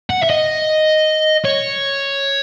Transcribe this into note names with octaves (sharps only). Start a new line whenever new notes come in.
F#5
E5
D#5
C#5